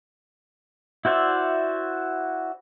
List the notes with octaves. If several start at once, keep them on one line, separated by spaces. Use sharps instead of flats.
E4 F#4 C5 D5 E5